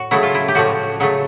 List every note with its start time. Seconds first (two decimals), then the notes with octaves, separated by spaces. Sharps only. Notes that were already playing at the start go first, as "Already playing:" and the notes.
Already playing: A2 F#4
0.11 C#3 F#3 A3 E4
0.23 F4
0.35 E4
0.48 G4
0.55 A2 F3 A3 F#4
1.00 C#3 F#3 A3